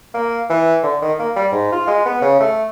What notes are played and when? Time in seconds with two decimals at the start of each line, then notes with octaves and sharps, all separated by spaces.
0.14 A#3
0.50 E3
0.83 D3
1.02 D#3
1.19 A#3
1.36 G3
1.52 G#2
1.72 F4
1.87 G#3
2.06 B3
2.22 C#3
2.40 A3